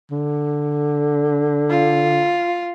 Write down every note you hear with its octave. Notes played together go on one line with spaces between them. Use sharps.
D3
F4